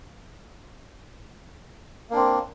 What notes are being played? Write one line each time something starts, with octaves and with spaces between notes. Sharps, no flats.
A#3 C4 D4